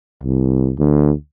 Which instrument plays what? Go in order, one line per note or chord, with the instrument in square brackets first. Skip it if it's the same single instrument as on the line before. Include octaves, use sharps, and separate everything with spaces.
[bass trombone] C2
D2